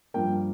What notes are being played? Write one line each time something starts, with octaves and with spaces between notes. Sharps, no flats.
G2 F3 A#3 G5